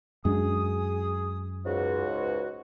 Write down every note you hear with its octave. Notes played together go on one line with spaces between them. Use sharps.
F#2 G#3 D4 G#4 D#6
C#2 G#2 F#4